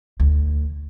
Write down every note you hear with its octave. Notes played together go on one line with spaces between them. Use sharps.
D2